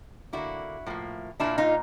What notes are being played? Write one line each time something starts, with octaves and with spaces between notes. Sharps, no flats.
D3 G3 A#3 E4 F#4
A2 F3 A#3
A#2 G3 A#3 D4 E4
D#4 F4